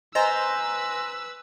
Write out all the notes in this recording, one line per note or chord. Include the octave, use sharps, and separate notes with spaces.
B4 C5 D#5 G#5 A#5 E6